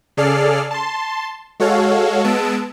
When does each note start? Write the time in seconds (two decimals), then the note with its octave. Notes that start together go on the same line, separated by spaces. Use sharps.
0.17 C#3 G#4 A4 D5 F6 C7
0.71 A5 C6
1.60 G#3 F#4 A4 C#5 F5
2.24 G#3 B3 A5 E6 D7